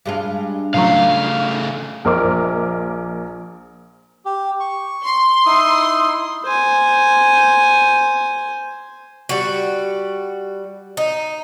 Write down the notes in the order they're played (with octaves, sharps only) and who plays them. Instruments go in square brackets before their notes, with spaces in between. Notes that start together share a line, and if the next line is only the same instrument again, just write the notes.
[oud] G2 G#3 F4
[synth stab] A2 F3 F#3 [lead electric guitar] C#3 A3 [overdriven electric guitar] F5
[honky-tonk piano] A#1 A#4 C5 D#5 D6
[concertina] G4
C#6
[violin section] C6
[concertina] D#4 E4 D#6
[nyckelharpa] C5 G#5
[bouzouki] G3 F#4
D#4